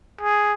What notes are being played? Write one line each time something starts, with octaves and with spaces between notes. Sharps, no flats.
G#4